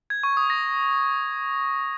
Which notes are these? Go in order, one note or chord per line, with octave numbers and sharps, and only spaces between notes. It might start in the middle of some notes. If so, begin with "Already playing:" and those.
G#6
C#6
D#6
A#6